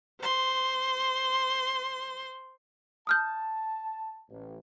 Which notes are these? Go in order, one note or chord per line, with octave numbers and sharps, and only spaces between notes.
C5 C6
A5 D#6 F6 G6
A1